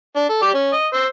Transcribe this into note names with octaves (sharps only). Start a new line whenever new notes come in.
D4
A4
G4 D5 G5
C#4
D#5
C5 E6